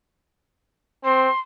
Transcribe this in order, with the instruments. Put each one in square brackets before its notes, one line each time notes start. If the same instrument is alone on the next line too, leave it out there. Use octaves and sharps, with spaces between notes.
[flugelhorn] C4 [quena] C6